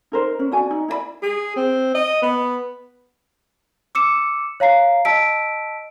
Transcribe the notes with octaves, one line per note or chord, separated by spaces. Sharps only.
D#4 A#4 C5
C#4
D4 F#4 G#5
D#4
E4 D5 B5
G#4
C4
D#5
B3
D6 E6 C#7 E7
C#5 F5 A#5 C7
D#5 A5 E6 B6 D7